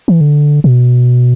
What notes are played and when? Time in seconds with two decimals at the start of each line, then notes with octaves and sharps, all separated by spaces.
0.08 E3
0.21 D3
0.64 B2